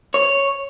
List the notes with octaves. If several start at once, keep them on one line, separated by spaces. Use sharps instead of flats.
C#5